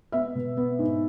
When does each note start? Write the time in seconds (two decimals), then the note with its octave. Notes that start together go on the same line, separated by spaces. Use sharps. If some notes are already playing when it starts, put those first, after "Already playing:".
0.12 B3 E5
0.35 B2
0.57 B3
0.79 G#2